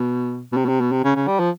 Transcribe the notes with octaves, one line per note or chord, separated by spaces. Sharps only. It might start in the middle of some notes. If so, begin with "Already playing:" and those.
Already playing: B2
B2
C3
B2
C3
B2
C3
C#3
C#3
G3
F3